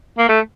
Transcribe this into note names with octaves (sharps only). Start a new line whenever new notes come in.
A#3
A3